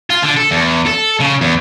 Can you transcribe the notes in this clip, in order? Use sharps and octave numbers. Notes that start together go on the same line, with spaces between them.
F4
D3
A4
E2
A4
C#3
E2